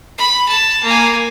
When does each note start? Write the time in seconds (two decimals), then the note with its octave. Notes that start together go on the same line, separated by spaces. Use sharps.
0.18 B5
0.48 A5
0.84 A#3 G#5